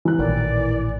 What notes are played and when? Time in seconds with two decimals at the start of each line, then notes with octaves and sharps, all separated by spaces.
0.05 E3 F#6
0.19 A1 A#2 D#3 A#4 D5